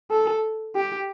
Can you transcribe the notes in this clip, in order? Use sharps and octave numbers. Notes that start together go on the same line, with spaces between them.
A4
G4